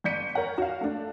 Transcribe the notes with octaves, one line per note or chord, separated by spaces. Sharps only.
G1 D5 G6 B6 C#7 D#7
A#4 C#5 F#5
F#4 F5
A3 D4